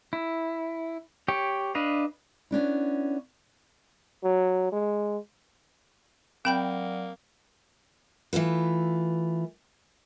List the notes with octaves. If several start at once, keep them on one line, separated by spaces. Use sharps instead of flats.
E4
G4 C#5 G5
D4 B4 D#5 F5
B3 C#4 D4 E4
F#3
G#3
F#3 A#3 C4 D5 F#5 G5 B5 G6
E3 A3 F4 B4